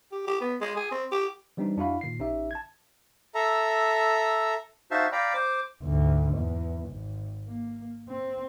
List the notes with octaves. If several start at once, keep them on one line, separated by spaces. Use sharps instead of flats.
G4
G4
B3
G#3
G#4
C4
G4
E3 G3 C4 D4 D#4
F2 D4 E4 F#4 F5 B5
A#2 D#3 C7
A1 C#4 D#4 G4 E5
A5 G#6
A4 E5 A#5
D#4 F#4 C5 E5 F5 A5
D5 F5 G5 A#5 B5
C5 D6
D2 G#2
E2
G#1
A#3
C4